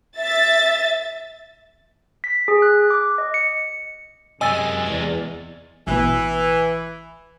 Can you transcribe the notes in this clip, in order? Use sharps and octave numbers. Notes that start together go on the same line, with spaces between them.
E5 A6
B6
G#4
F#6
D6
D#5
C#7
F#2 C3 G#3 D#5 G#5 E6 A6
E2 D5
A1 B2 E3